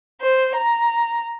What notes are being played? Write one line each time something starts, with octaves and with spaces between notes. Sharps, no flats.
C5
A#5